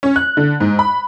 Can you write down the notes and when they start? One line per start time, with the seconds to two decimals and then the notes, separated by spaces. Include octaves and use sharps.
0.03 C#4
0.16 F#6
0.37 D3
0.60 G#2
0.79 B5